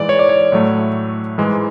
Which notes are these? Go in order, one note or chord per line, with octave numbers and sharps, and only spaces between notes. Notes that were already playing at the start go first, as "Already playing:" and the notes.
Already playing: G#2 E3 G#3 D5
C#5
D5
C#5
A2 F#3 A3
G#2 E3 G#3